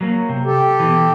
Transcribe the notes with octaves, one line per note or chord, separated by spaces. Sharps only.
F#3 A#3
C3
G4 A4
B2 E3